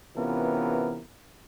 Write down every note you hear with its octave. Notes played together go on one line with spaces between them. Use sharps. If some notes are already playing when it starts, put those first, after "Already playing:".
C3 E3 B3 C#4 F4 A#4